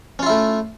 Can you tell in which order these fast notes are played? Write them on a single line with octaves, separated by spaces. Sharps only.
C#4 F4 E4 A3